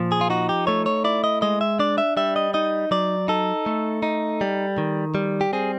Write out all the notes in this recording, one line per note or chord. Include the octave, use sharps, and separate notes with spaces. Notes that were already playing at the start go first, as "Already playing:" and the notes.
Already playing: A#2 F3
G#4
F4
D#4 F#4
G4
A3 C#5
C#5
E4 D5
D#5
G#3 D#5
E5
D4 D5
E5
G3 E5
D#5
D#4 D#5
F#3 D5
D#4 A4
A3
D#4
G3
D#3
G3
G4
C4 G#4